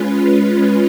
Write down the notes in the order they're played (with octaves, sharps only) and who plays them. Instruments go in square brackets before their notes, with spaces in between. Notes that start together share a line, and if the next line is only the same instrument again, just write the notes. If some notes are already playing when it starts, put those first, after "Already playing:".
Already playing: [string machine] G#3 C#4 F4 B4